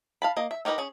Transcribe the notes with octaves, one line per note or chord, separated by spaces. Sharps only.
F5 A5 B5
A#3 D#5
E5
D#4 G4 A#4 B4 D#5
C#4 G#4